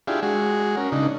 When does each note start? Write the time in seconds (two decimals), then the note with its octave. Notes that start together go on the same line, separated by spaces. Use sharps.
0.07 D4 E4 F4 G4 G#4
0.23 G#3 F#4 G#4
0.77 C#4 A#4
0.92 C#3 D4 D#4